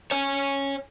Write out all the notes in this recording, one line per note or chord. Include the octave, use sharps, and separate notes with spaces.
C#5 G#5